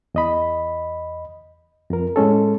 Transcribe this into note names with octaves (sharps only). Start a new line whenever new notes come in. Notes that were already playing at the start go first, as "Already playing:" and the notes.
E2 D#5 B5
F2 A#4
A2 G#3 C#4 A4